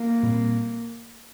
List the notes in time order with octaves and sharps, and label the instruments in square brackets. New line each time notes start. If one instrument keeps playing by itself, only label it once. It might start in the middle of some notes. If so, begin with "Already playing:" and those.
Already playing: [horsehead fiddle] A#3
[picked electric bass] A#2 G3 C4